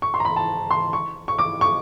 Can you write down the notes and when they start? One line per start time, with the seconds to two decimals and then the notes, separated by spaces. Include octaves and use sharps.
0.02 C#6
0.14 C6
0.20 A#5
0.25 B5
0.36 A5
0.71 C6
0.93 C#6
1.28 C#6
1.38 D6
1.61 C#6